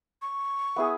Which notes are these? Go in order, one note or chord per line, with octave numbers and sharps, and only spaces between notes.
C#6
B3 E4 G#4